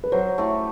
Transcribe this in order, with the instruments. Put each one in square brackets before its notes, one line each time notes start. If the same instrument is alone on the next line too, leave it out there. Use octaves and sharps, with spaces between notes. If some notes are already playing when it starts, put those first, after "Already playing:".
[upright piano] B4
[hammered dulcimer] F#3 [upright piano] C5
[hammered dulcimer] A3 E4 G4